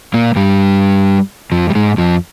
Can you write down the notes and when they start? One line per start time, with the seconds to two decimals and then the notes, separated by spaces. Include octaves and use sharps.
0.14 A#2 A#3
0.36 G2 G3
1.52 F2 F3
1.70 G3
1.75 G#2 G#3
1.98 F2 F3